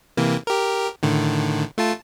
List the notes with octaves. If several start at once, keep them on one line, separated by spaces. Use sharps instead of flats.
C3 E3 A#3
G4 A#4
A2 D3 D#3
A3 F4 A5